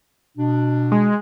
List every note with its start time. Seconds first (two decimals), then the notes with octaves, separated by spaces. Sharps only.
0.38 B2 D4
0.92 G#3